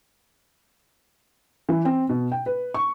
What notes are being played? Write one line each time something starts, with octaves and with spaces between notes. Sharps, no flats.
E3
C4
B2
G5
B4
C#6